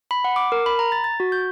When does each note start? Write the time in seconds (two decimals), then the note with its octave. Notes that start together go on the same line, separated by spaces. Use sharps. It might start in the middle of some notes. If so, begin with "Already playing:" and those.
0.11 B5
0.24 F#5
0.36 D6
0.52 A#4
0.66 B5
0.79 A#5
0.92 A6
1.04 A6
1.20 F#4
1.32 G6